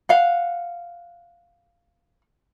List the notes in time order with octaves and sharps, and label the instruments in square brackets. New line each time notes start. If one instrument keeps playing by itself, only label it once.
[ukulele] F5 F#5